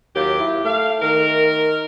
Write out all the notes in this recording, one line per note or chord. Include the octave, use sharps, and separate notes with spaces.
D#2 F#3 F4 G4
E4
A3 F5
D#3 A#4